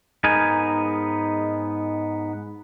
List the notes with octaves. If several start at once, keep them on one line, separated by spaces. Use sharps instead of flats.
G#2 B3 D#4 A#4 G#5